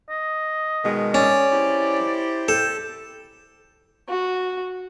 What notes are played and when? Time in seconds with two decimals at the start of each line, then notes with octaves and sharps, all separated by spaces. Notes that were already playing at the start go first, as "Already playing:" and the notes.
0.10 D#5
0.85 B2 D#3 G#3
1.14 C#4 D5
1.53 E4 G4 C5
2.48 A4 G5
4.08 F#4